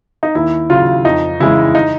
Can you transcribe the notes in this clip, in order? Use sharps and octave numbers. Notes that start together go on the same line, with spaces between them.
D#4
D#2 E4
C#3 F#3 F4
F2 D#4
C#3 E3 G#3 E4
D#4